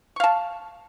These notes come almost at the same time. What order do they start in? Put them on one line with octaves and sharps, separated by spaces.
C#6 F5 A5